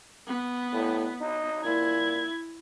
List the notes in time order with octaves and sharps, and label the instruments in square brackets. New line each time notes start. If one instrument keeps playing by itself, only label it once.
[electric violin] B3
[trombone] A2
D#4
[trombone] A#2 [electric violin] E4 G#6